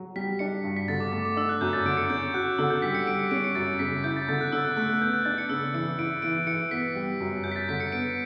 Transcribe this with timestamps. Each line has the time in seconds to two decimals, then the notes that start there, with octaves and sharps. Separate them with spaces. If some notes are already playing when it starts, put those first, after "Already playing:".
Already playing: F#3
0.16 G3 B6
0.39 D4 C#7
0.64 G2
0.77 B6
0.88 D3 A6
1.00 D6
1.13 A3 D6
1.25 D6
1.37 D4 E6
1.49 F#6
1.61 F#2 G6
1.73 A6
1.85 D3 D7
1.97 C#7
2.10 C#4 G6
2.34 F#4 F#6
2.58 D3 E6
2.70 G6
2.82 G3 B6
2.95 C#7
3.07 G3 D7
3.19 C#7
3.31 C#4 D7
3.44 C#7
3.55 F#2 A6
3.79 C#3 B6
4.04 E4 G6
4.16 A6
4.28 D3 A6
4.41 F#6
4.52 D3 E6
4.65 F#6
4.77 A3 F#6
4.90 F#6
5.01 B3 G6
5.13 F#6
5.25 D4 A6
5.38 C#7
5.49 C#3 E6
5.74 E3 C#7
5.98 E4 D7
6.22 E3 D7
6.47 E3 C#7
6.71 B3 B6
6.95 G3
7.20 F#2
7.44 F#2 G6
7.52 B6
7.56 A6
7.68 D3 B6
7.80 C#7
7.92 B3 D7